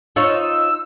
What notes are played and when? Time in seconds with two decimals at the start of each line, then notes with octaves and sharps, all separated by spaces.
0.16 D#4 F4 C#5 E6